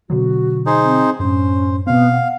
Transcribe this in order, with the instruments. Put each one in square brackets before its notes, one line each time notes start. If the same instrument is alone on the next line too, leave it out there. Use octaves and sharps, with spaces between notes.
[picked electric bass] B2 D3 F#3 [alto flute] F#4
[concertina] D#4 G#4 C5
[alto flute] C4
[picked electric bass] F#2 A2 [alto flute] C#4 [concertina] C5
[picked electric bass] B2 C4 [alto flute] B3 [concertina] F5
[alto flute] F#5